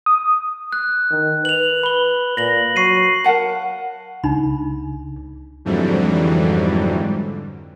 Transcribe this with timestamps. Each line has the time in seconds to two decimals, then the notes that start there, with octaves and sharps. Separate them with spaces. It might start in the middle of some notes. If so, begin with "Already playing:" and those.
0.06 D#6
0.73 F#6
1.11 D#3
1.45 B4 F7 F#7
1.83 B5 G7
2.37 A#2 A#6 F#7
2.76 F#3 C#6 C7 D#7
3.24 A#4 F5 F#5 A5
4.24 C#2 D4 D#4 B5
5.65 F2 G#2 D3 E3 F#3 G3